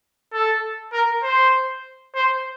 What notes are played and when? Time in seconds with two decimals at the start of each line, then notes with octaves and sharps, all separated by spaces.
0.32 A4
0.92 A#4
1.23 C5
2.15 C5